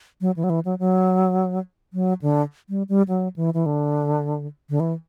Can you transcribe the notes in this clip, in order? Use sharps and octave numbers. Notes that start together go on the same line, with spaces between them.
F#3
E3
F#3
E3
F#3
F#3
F#3
D3
G3
G3
F#3
E3
E3
D3
D3
E3